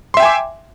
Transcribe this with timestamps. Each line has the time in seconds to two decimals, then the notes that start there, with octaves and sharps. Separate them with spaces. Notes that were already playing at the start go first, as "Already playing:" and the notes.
0.14 C6
0.17 E5
0.20 G5
0.23 G#5
0.25 D6